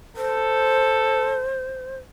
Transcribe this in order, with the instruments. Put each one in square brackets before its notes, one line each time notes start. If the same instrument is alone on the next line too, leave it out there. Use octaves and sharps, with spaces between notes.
[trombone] A4 [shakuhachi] C5